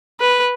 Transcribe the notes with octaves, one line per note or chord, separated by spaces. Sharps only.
B4